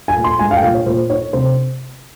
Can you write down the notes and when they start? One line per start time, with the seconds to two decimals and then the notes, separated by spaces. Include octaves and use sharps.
0.08 G#5
0.16 A#2
0.24 C6
0.39 G#3 G#5
0.51 F5
0.57 G5
0.63 A#2 F5
0.74 C#5
0.86 A#2 C5
1.10 D#4 C#5
1.33 C3 C5